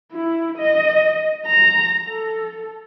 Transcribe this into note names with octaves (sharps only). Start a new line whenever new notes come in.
E4
D#5
A#5
A4